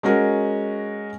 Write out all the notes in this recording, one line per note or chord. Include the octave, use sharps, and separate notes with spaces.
G#3 C#4 F#4 A#4